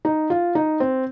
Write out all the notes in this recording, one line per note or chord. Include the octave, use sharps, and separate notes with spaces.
D#4
F4
D#4
C4